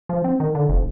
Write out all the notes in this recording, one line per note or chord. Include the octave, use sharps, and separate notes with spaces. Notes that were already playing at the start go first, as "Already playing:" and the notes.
F3
C4
D#3
D3
F1